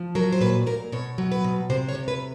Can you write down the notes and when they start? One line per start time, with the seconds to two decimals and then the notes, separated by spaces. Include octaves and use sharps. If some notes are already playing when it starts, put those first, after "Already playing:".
Already playing: F3
0.15 F#3 A#4
0.32 C5
0.41 A#2 B4
0.66 A#2 A#4
0.92 B2 C#5
1.18 F#3
1.32 B4
1.44 B2
1.70 C3 C5
1.89 C#5
1.95 C3
2.08 B4